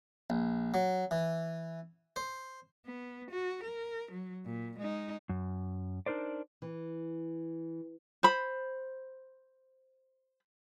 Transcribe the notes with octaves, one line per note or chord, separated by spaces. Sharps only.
A#1
F#3
E3
C5
B3
F#4
A#4
F#3
A#2
G#3 D#4
F#2
D4 D#4 A#4 C5 D5
E3
C5 B5